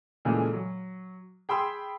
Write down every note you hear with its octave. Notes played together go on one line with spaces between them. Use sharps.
A#2 C#3 E3 F3 G#3 A3
F#3
G#4 G5 B5 C6 E6